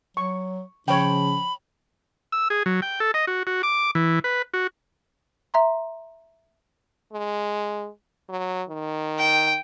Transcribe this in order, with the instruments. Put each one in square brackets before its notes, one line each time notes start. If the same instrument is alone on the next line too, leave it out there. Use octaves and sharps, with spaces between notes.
[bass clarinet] F#3 [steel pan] C#6
[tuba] C#3 [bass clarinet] F3 [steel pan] C#5 G5 [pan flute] B5
[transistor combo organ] E6
G#4
F#3
G5
A4
D#5
F#4
F#4
D6
E3
B4
F#4
[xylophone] E5 A#5 C6
[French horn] G#3
F#3
D#3
[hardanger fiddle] G5